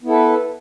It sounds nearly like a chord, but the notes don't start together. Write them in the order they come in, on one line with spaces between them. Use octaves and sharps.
B3 E4 A4 B4